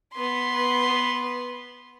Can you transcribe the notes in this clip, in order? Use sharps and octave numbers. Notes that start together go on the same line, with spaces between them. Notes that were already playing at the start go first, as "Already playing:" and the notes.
B3 C6